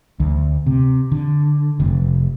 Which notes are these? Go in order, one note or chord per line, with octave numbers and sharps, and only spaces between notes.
D2
C3
D3
F1